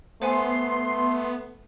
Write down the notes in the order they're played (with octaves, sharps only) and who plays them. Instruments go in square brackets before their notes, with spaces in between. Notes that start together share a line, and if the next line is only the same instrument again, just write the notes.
[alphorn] A3 [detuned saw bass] B3 [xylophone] C5 F#5 G#5 [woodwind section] C6